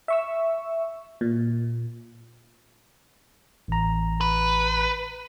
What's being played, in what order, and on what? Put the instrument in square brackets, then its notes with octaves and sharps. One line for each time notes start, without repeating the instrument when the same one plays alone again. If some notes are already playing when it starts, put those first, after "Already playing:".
[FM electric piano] E5 C#6 E6
A#2
[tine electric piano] A1 A#5
[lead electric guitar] B4